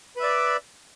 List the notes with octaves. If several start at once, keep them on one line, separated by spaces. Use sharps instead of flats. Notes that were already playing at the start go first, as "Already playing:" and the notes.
B4 D5 E5